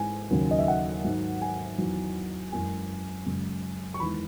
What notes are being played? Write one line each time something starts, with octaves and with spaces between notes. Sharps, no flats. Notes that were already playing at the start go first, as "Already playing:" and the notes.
Already playing: G#2 E3 G#3 G#5
D#2 C#3 F#3
D#5
E5
F#5
G#2 D#3 F#3
G#5
E2 D#3 F#3
F#2 E3 G#3 G#5
F#2 C#3 G#3
C#6
E2 D#3 G#3 B5